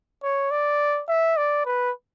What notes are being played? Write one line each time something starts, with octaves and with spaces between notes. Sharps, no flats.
C#5
D5
E5
D5
B4